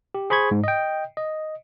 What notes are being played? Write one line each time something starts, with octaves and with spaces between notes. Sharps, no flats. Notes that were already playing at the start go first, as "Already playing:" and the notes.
G4
G#4 C5 B5 C#6 G#6
G#2
D#5 G5
D#5